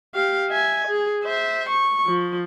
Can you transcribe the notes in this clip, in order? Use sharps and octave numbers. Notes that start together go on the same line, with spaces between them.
G4 F5
E5 G#5
G#4
C5 E5
C#6
F3